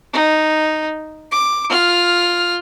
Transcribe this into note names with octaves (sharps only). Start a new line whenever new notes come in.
D#4
D6
F4 F6